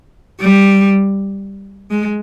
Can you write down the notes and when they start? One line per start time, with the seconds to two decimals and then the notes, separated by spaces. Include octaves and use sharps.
0.41 G3
1.91 G#3